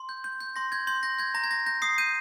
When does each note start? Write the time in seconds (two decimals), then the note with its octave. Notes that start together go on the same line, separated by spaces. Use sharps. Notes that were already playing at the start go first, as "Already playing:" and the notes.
Already playing: C6
0.09 G6
0.24 G6
0.40 G6
0.56 C6 A#6
0.72 G6 G#6
0.87 C6 G6
1.03 G6 A#6
1.18 G6 G#6
1.34 A#5 A#6
1.44 G#6
1.51 A#5 A#6
1.66 G6 A#6
1.82 D#6 C7
1.98 G6 D#7